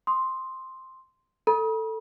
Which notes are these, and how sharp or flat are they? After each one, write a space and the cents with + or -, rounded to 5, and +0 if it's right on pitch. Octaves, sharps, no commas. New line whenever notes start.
C6 +0 D#6 +0
A4 +10 B5 -45